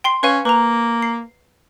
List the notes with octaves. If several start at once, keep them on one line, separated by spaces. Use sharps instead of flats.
G5 C6 C7
C#4 B4 F5 G#5
A#3 B4 A#5
C7